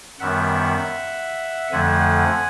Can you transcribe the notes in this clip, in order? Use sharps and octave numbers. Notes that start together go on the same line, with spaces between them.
F#2 D#3 G3 B3 E5 F#5
F2 D3 F3 A3 F#5 G#5